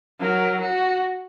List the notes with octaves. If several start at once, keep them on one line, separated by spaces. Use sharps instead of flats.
F#3 A#4
F#4